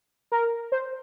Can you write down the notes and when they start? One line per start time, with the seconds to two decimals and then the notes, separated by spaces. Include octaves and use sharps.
0.32 A#4
0.72 C5